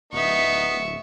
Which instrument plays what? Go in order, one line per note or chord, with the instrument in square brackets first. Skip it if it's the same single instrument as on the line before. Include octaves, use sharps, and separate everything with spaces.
[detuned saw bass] D1 [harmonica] B3 D#4 [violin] E5 C#6